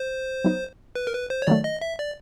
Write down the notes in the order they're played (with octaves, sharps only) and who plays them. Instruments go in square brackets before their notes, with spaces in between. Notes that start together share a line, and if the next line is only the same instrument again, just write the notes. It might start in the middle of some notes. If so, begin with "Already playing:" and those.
Already playing: [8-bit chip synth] C5
[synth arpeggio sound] F#3 B3 D#4
[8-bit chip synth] B4
A#4
B4
C5
C#5
[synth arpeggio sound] D#3 F#3 A3 [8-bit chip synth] D5
[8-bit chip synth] D#5
E5
D5